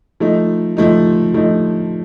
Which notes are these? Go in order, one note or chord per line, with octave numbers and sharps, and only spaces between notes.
F3 A3 D#4
F3 A3 D#4
F3 A3 D#4